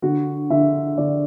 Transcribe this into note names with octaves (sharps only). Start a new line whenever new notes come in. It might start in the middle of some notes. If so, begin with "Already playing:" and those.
D3 F#4
D3 E5
D3 D5